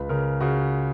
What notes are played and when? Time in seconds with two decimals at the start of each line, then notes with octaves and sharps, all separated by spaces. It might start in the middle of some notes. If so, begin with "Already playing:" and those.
Already playing: C#2 B4
0.09 C#3 A#4
0.40 C#3 F#4